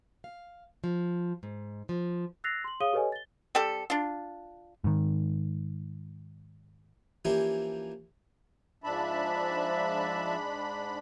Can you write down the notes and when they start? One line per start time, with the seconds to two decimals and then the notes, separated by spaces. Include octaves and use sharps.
0.24 F5
0.84 F3
1.43 G#2
1.89 F3
2.44 E6 F#6 A6 A#6 C7 F7
2.64 C6 F#7
2.80 G#4 C#5 F5 D#6 D#7 G7
2.93 G4 A4 B4 C#5 D#5 G#5
3.12 A6 G7
3.55 G3 C4 G4 A4
3.90 D4 F4
4.84 G#2 D#3
7.25 E3 F3 A#3 C#4 E4 G4
8.84 G#2 F3 D4 E5 A5 B5